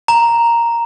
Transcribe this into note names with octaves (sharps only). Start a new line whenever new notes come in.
A#5